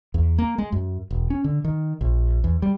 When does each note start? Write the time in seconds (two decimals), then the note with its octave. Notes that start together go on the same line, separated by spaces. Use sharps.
0.14 E2
0.38 A#3
0.58 G#3
0.72 F#2
1.11 E1
1.30 C#4
1.44 D3
1.64 D#3
2.01 A#1
2.44 E2
2.62 G3